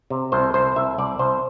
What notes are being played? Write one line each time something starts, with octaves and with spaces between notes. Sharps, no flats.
C3
C2 C5
C2 C5
C2 E5
C2 D5
C2 C5